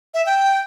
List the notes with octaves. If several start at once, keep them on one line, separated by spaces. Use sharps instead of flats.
E5
G5